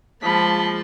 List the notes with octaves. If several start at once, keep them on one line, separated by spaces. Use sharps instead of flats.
F3 G#3 A#3 A5 B5 C6